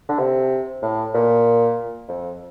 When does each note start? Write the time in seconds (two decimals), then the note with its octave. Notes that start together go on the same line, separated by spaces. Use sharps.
0.09 D3
0.19 C3
0.82 A2
1.14 A#2
2.09 F2